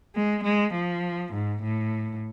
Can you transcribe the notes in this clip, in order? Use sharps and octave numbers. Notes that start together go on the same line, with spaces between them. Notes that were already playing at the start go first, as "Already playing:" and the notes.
G#3
G#3
F3
G#2
A2